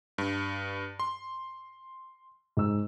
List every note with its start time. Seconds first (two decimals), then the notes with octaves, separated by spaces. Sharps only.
0.18 G2
1.00 C6
2.57 G#2 E6